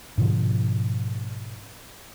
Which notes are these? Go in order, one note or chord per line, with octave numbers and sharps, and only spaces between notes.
G#2 B2 D3 F3